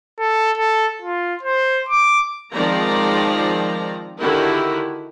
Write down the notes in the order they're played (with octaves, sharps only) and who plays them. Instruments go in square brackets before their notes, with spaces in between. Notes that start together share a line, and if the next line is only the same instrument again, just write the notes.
[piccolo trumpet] A4
A4
F4
C5
D6
[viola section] D#3 F3 G#3 C4 D5 A#5
D3 D#3 E4 F#4 G4 A#4